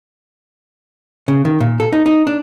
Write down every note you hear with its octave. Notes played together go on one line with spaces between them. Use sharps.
C#3
D#3
A#2
A4
D#4
D#4
D4